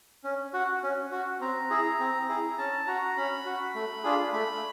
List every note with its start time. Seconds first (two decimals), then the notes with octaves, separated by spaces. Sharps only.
0.24 C#4
0.54 F#4
0.83 C#4
1.12 F#4
1.41 C4 A#5
1.70 E4 G#4
2.00 C4
2.29 E4 G#4
2.58 C#4 A5
2.87 F#4 A#5
3.17 C#4 B5
3.46 F#4
3.75 A3
4.04 D4 F4 G#4
4.33 A3 B5